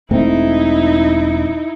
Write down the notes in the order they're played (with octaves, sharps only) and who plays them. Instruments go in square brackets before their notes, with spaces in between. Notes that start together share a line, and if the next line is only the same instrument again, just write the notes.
[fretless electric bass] E1 A3 C4 [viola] D#4 E4